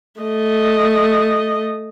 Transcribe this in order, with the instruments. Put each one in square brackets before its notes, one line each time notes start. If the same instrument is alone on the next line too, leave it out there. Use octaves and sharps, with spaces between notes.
[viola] A3 D#5